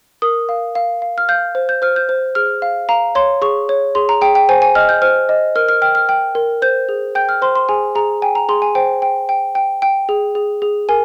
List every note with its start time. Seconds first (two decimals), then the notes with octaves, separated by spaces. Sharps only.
0.22 A#4 D#6
0.49 F5
0.75 F5
1.02 F5
1.18 F6
1.29 F5 G6
1.55 C5
1.69 G6
1.82 C5 F6
1.96 G6
2.09 C5
2.35 G#4 F6
2.62 F5
2.89 F5 A#5
3.15 C#5 C6
3.42 G#4 C#6
3.69 C#5
3.95 G#4 C6
4.09 A#5
4.21 G#4 G5
4.35 G5
4.49 C5 G#5
4.62 G#5
4.75 D#5 F6
4.89 G6
5.02 C5 F6
5.29 D#5
5.56 A#4 F6
5.69 F6
5.82 G5 F6
5.95 F6
6.09 G5
6.35 A#4
6.62 C5 G6
6.89 G#4
7.15 G5 G6
7.29 F6
7.42 C5 C6
7.55 C6
7.69 G#4 G#5
7.95 G#4 A#5
8.22 G5 G#5
8.35 A#5
8.49 G#4 C6
8.62 G#5
8.75 C5 G5
9.02 G5
9.29 G5
9.55 G5
9.82 G5
10.09 G#4
10.35 G#4
10.62 G#4
10.89 A#4 G#5